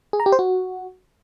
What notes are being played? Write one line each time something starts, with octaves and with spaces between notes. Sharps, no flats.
G#4
A#5
G4
C5
F#4